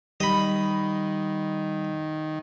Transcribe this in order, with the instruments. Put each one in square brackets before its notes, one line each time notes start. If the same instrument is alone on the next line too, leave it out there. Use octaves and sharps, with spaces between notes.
[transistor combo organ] D#3 [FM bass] G3 [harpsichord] D#5 B5